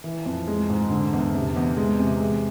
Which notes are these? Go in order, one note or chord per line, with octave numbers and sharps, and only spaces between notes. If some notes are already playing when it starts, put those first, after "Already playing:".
E3
F2
G#3
G#2
D3
E2
C3
E2
G#3
C3
G#3